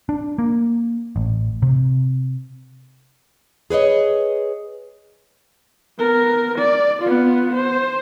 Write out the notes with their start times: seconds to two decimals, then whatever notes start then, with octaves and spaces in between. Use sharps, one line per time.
0.09 D4
0.39 A#3
1.16 A1
1.62 C3
3.70 G#4 B4 C#5 D#5
5.98 B3 A#4
6.58 D5
7.02 B3 F4
7.54 C5